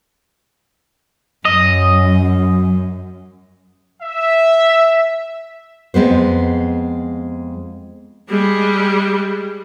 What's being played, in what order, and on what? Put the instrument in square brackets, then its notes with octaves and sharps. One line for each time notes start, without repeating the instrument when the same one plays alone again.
[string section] F#2 [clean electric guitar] D#5
[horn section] E5
[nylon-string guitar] F2 G#3 B3 C5
[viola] G3 G#3